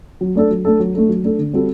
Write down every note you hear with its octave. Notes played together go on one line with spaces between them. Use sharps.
F#3
A3 D4 A4
F#3
A3 D4 A4
F#3
A3 D4 A4
F#3
A3 D4 A4
D3
G3 C4 F#4 A4